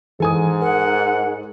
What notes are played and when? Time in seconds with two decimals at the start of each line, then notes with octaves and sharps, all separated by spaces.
0.20 G#2 E3 A4 G#5 D#6
0.62 A#4 F#5